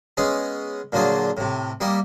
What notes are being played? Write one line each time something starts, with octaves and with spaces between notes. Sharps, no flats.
G#3 B3 C#4 G#4
A#2 D3 F#3 F4 G#4
A2 C3
G3 A#3 E4 D#5